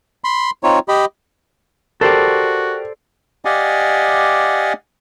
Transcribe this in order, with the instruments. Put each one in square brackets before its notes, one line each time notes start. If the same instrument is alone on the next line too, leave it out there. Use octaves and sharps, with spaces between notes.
[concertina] B5 C6
C4 D#4 F4 C#5
G4 D#5 B5
[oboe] F#4 [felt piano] G4 A#4 [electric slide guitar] A4 C5 D5
[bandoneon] G4 D5 D#5 F5 F#5 G#5